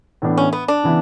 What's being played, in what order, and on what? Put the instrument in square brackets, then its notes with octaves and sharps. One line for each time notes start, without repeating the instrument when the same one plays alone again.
[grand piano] A2 E3 B3 D4
[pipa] C#4
B3
D4
[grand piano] C#3 E3 B3 E4